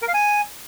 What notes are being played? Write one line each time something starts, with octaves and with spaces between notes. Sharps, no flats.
A#4
F5
G#5